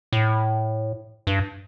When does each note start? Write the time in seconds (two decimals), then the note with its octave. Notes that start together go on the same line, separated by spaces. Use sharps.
0.13 A2
1.27 G2